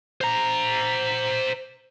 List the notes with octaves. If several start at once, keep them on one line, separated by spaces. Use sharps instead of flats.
C5 A#5